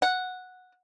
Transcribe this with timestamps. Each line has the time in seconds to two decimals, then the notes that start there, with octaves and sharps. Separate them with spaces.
0.02 F#5